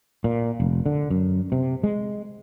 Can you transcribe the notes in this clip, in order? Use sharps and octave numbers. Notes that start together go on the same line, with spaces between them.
A#2
F1
D3
F#2
C3
G#3